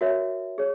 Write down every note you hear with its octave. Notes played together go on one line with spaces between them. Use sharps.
F#4 A#4 C#5 E5
G#4 C#5